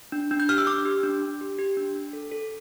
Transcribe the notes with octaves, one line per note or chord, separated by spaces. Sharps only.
D4
D4
G6
G4 F6
E6
D4 D6
G4
D4
D4
G4
G4
D4
D4
A4
A4